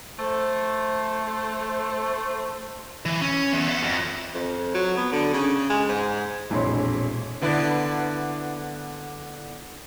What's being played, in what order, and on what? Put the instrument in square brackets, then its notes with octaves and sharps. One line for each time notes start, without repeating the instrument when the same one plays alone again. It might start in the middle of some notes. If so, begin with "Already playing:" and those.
[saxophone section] A3 C5
[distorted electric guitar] E3
C#4
E2
E5 F#5
F2
[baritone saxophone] F2
F#3
B3
D3
C#3
G#3
G#2
[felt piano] E1 A#1 F2 E4 C#5 C6
[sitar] D3 B3 E4